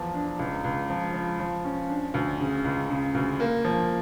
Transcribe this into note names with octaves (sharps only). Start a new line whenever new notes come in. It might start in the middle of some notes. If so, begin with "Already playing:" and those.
Already playing: E2 F3
D4
C#2
C#2
F3
F3
F3
C#4
D4
D2
C#3
C#2
C#3
D2
A#3
F3